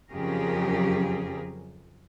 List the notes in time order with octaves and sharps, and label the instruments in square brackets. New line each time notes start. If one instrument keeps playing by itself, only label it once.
[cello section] F2 C#3 F#3 G4 G#4 A#4